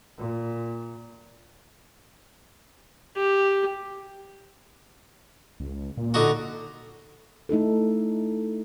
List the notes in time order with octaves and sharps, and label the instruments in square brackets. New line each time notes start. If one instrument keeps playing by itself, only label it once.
[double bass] A#2
[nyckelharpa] G4
[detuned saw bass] C#2
A#2
[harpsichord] D3 D#4 F#4
[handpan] A3 D#4 E4 A4